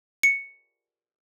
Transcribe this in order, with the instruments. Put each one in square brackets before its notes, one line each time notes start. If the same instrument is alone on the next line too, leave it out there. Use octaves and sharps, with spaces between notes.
[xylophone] C#7